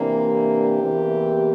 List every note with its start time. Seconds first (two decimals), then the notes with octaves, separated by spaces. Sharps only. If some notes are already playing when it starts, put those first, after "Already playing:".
Already playing: C3 E3 A#3 D4
0.15 G4
0.82 E2 C3 E3 A#3